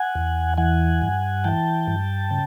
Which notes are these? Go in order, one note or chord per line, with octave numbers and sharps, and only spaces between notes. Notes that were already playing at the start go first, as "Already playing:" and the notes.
Already playing: F#5 G#5
E2
E3 F#5 G#5
G2
E3 G5 A5
G2
C#3